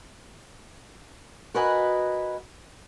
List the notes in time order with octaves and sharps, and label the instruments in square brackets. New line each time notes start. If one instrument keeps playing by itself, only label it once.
[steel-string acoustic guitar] F#4 A#4 B4 D#5 F#5 G#5